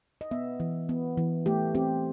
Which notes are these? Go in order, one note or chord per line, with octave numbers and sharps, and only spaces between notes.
D#5
B3 E5
E3
B3
E3
A3 G4
C4 G4